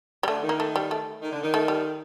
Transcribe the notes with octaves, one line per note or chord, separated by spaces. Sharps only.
G3
D3 A3
D#3
A#3
A3
G3
A3
D#3
D3
D#3
A3
G3